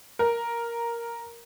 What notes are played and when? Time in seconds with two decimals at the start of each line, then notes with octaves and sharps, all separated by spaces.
0.19 A#4